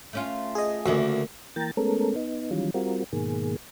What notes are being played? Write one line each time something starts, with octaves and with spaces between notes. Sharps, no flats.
A3 C#4 F4
G#4 D#5
D2 C#3 A#3 E5
E3 A#3 G5 A#5 A6
G#3 A3 B3 C#4 A4 A#4
B3 D#4
D#3 E3 F#3 G3 C#4 F4
G3 C4 F4 F#4 A#4
G#2 B2 D#3 A#3 G#4